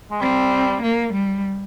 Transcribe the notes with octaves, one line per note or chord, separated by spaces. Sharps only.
G#3
G3 C4
A#3
G3